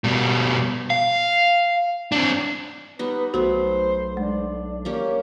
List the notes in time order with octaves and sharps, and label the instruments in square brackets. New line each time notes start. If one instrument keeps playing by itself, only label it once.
[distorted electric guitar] B2 G3
F5
C4 D4
[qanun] G3 B3 D#4 [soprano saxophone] B4
[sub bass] B1 [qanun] A3 B3 [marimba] F#4 [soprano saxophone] C5
[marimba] G#3 [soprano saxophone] D4
[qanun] A#3 C#4 G4